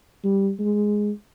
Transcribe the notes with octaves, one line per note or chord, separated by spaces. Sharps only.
G3
G#3